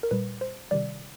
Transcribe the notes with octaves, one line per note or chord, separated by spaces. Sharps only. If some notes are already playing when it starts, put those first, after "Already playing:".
A#4
A#2 G3 B4
C5
C3 D#3 G3 D5